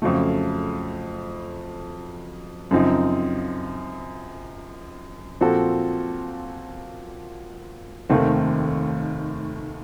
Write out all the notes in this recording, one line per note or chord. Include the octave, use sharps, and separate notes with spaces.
F2 C#3 F#3 A3
F#2 C#3 F3 C4 D#4
A#2 F3 C4 F#4 A4
F1 D#2 D#3 A3 C4